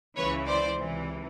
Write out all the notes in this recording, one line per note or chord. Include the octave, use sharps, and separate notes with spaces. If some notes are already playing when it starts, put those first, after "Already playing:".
C#2 C#3 E3 B4 C#5
C5 D5
C#2 C3 E3